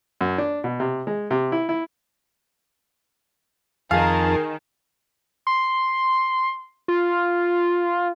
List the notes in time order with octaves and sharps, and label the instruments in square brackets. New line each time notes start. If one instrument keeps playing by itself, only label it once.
[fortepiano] F#2
D4
B2
C3
G#3
C3
E4
E4
[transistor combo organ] F2 A5 [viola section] D#3 [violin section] G#4 A#4 [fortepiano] F5
[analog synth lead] C6
F4